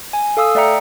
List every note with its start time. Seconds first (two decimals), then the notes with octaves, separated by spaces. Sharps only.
0.13 G#5
0.37 A4 F5 D#6 E6
0.55 A3 D5 E5 G5 A#5 C#7